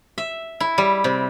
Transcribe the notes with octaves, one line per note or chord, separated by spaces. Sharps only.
E5
E4
G3
C3